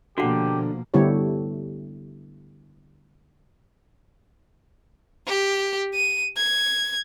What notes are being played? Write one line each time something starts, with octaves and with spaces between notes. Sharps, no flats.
B2 D3 F3 A#3 F#4 G4 F#5
D3 G3 B3 E4 G4 C#5
G4
D#7
G#6